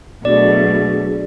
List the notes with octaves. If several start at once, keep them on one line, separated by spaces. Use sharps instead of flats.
B2 F#3 A3 D4 F#4 G#4 D5